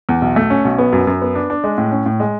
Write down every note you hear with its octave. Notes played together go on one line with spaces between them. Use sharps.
E2
B1
A3
C#4
B1
B3
F#2
F#2
B3
D4
D4
G#3
A2
C#4
A2
G#3